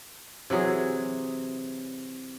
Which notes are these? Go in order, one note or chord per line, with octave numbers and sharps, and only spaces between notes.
C3 E3 F#3 G#4